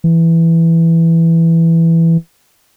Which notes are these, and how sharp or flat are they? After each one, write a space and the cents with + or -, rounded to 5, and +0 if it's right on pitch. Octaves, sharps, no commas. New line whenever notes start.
E3 +5